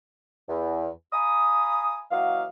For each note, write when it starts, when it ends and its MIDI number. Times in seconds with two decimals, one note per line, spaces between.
0.48 0.88 40
1.12 2.02 77
1.12 2.02 80
1.12 2.02 82
1.12 2.02 83
1.12 2.02 87
2.11 2.44 52
2.11 2.44 54
2.11 2.44 58
2.11 2.44 66
2.11 2.44 75
2.11 2.44 77